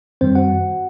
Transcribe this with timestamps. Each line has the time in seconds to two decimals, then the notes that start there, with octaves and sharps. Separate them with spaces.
0.21 F#2 D#3 G3 C4 C5
0.35 F#4 F#5